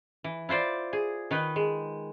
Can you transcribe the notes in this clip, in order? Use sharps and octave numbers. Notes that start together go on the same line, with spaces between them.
E3
E4 F4 C5 D5
G#4
D#3 D#4 B4
G#3